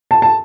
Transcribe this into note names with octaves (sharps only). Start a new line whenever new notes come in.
A5
A5